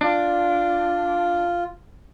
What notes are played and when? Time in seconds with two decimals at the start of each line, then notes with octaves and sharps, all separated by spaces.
0.01 D4 F4